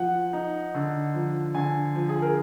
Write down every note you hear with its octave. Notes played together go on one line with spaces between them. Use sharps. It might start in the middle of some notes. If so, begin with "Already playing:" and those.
Already playing: F3 F#5
D#4
D3
F3
D3 G#5
F3
G#4
A#4